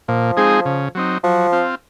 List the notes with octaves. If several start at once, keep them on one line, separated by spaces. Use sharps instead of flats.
A#2 F3
G#3 C4 D#4 G#4
C#3
F#3 C4 D#4
F3 F#3
C4 F4